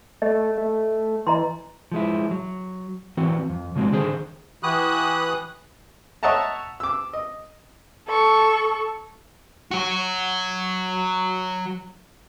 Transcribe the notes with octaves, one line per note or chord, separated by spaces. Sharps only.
A3 D#5
A3
E3 D#5 A#5 C6
F3 G#3 E4
F#3
E3 C4 F#4
F2
C#3 F3 G#3 C4 F#4
D3 D#3 G#4 C5
E3 E4 F#4 G4 D#6 F#6
C#5 D#5 E5 F#5 A5 A#5
D6 E6
D#5
A4 C#6
F#3 F#4